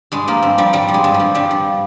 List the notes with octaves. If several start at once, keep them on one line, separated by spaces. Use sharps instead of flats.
G2 G#3
F3 A#3
G2 C4
F3 G3
G2 G3
F3
G#3
G2
G3
F3
G2 G3
F3